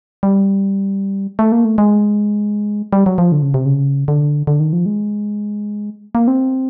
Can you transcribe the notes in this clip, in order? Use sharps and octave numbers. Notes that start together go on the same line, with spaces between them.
G3
A3
A#3
A3
G#3
G3
F#3
F3
D3
C#3
C3
C#3
D3
D3
D#3
F3
G#3
A#3
C4